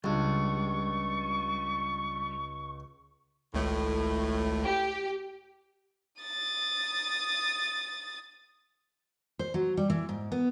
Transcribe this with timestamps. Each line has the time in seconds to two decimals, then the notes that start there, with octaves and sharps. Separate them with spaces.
0.04 C#2 G3 D4 C#6
3.54 G#1 C#2 A2 A3
4.64 G4
6.21 D#6 A6
9.39 C5
9.54 F#3
9.77 G3
9.90 E3
10.09 G#2
10.32 B3